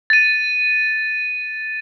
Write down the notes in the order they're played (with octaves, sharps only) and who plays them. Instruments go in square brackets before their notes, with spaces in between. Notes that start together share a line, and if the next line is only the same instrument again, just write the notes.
[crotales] A6 D#7